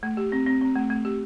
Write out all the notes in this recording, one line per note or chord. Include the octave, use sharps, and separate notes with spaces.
A3
G4
C4
C4
C4
A3
A3
G4